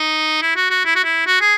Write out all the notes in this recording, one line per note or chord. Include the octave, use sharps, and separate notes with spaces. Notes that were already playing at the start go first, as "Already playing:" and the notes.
Already playing: D#4
E4
F#4
F#4
E4
F#4
E4
F#4
G#4